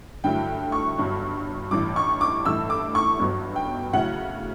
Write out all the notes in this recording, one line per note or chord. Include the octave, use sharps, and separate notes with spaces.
G2 D3 F#3 A3 E4 G5
C#6
G1 G2 F#3
A1 G2 E3 G3 D6
C#6
D6
A1 G2 E3 A3 E6
D6
C#6
G1 G2 F#3 B3
G5
D2 C#3 F#3 C#4 E4 F#5